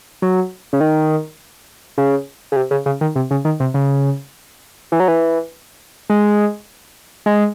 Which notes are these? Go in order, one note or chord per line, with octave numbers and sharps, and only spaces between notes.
F#3
C#3
D#3
C#3
C#3
C3
C#3
C#3
D#3
C3
C#3
D#3
C3
C#3
E3
F#3
E3
G#3
G#3